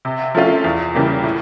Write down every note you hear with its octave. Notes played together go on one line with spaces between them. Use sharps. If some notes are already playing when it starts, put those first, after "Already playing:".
C3
F3 A3 C#4 F4
E2
C#3 E3 G3 A#3
A2